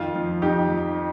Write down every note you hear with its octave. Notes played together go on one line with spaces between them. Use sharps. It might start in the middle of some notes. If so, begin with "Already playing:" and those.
Already playing: F2 D#3 F4
F3
F2 D#4 G4
F3